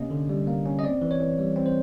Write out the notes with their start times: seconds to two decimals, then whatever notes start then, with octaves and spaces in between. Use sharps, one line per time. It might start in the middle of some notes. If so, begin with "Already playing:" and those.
Already playing: C3 A#3 C#4 D#5
0.10 D3
0.29 G3
0.47 A#3
0.66 C#4
0.79 D#5
0.84 C4 D5
1.02 E3
1.11 C#5
1.20 E3
1.39 G3
1.56 C4
1.66 C5